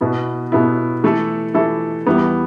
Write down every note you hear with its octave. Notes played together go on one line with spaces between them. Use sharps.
B2 B3 E4
B2 B3 E4
E3 A3 E4 A4
E3 A3 E4 A4
E2 E3 G3 B3